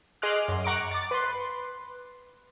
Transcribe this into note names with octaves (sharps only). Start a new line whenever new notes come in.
G#4 D#5 C6 D6 F6 F#6
F#2
F#5 A#5 C#6 D6 D7
D6 A6
B4 C6